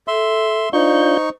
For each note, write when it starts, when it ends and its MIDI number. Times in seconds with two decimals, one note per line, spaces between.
0.08 0.68 69
0.08 0.69 76
0.08 0.69 84
0.73 1.17 62
0.73 1.29 63
0.73 1.17 65
0.73 1.26 72
0.73 1.29 85
0.73 1.17 91